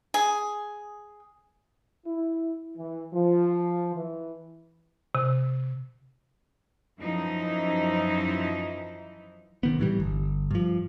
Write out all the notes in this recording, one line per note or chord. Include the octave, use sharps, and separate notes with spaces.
G#4
E4
E3
F3
E3
C3
F#2 E3 F3 D#4 E4
C3 D#3 B3
A2 E3 G3
G1
G2 F3